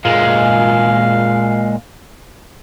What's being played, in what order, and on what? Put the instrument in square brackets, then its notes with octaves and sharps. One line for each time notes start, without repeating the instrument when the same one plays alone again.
[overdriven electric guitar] A#2 G#3 [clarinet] F5